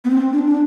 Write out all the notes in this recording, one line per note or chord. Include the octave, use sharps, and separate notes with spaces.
B3
C4
D4
D4